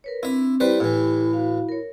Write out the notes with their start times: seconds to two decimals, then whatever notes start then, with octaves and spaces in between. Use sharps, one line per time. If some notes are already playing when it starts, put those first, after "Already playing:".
0.04 A#4 B4 C#5
0.23 C4 D4 E4 E5
0.60 G3 E4 G4 B4 C5
0.80 A2 E3
1.33 F#4 F5
1.69 A#4 C#5